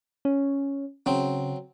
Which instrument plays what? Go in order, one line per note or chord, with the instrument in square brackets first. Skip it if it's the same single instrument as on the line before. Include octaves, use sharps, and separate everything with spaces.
[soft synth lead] C#4
[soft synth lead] C#3 [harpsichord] F#3 C4